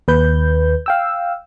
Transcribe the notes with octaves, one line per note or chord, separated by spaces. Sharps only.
D#2 B4 G6
F5 G5 E6